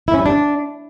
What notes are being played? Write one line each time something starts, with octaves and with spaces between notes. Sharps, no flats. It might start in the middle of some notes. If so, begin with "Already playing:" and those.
E4
C#4
G3
D4